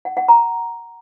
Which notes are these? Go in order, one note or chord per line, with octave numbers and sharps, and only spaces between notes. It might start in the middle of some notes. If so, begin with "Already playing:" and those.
F#5
F#5
A#5